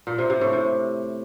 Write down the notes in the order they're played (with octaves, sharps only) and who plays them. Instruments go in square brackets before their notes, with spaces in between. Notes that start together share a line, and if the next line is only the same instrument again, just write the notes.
[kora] A#2
C3
C3
A2
C3